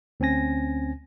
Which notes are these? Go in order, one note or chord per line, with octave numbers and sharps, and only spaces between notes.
D2 C4 C#4 G#5 A#6